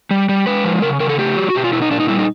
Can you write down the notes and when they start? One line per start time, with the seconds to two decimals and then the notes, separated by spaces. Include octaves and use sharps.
0.11 G3
0.29 G3
0.47 G#3 B4
0.64 F3
0.82 C#3 A#4
1.00 C#3 A#4
1.09 A4
1.18 A3 G4
1.37 F#3
1.50 F#4
1.55 B2 G4
1.64 F4
1.73 B2 E4
1.82 D#4
1.91 A#2 D4
2.00 D#4
2.08 G3 E4
2.19 D#4